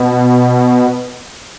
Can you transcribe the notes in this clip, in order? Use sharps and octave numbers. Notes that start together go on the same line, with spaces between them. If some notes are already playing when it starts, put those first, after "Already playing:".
Already playing: B2